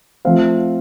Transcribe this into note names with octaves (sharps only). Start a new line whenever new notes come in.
F3 A3 C4 F5